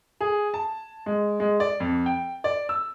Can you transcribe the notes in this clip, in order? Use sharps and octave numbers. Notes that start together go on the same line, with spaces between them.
G#4
A5
G#3
G#3
D5
F2
G5
D5
E6